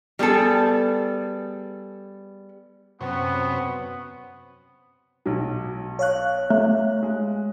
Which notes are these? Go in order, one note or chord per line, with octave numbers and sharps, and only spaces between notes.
G3 B3 G#4 A4
F#2 C3 B3 C#4
B1 F#3
C#5 F5 F#6
A3
G#3